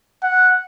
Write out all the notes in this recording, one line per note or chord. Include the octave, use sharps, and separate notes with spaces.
F#5